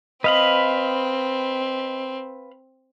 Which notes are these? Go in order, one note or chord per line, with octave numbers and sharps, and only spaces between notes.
C4 B4 D#5 F5 B5